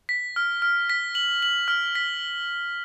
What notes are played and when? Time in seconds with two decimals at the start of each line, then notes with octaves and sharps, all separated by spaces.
0.09 B6
0.36 F6
0.62 F6
0.90 B6
1.15 F#7
1.42 F#7
1.68 F6
1.95 B6